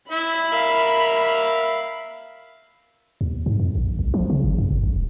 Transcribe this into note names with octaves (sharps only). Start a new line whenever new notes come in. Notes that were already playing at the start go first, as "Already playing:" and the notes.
E4 E5 B5
A#4 E5 F5
D#2
G#2
F2
A#1
C2
F3
C#3
G1
F#2
G#1
B1
D1